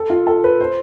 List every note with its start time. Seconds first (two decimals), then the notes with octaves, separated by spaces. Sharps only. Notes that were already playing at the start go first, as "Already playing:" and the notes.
Already playing: A4
0.10 F4
0.27 A4
0.44 B4
0.60 C5